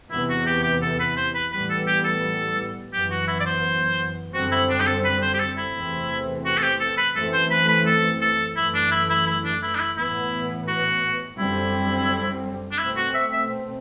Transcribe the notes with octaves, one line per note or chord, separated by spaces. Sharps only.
E2 C3 E3 B3 E4
F#4
G4
G4
A4
B4
C5
B4
A2 E3 G3 B3 B4
A4
G4
A4
F#2 E3 B3 G4
F#4
E4
D5
C5
F#2 D3 G3 C4 F#4
E4
D4
G4
A4
B4
C5
G4
A4
E4
E2 C3 E3 A3 C4
F#4
A4
G4
A4
B4
F#2 E3 A3 C4 A4
C5
B4
B4
A4
A4
F#2 E3 A3 E4
D4
E4
E4
E4
D4
E4
D4
E4
A2 E3 B3 E4
F#4
F#2 D3 G3 C4 E4
D4
B2 A3 C4 E4
F#4
E5
E5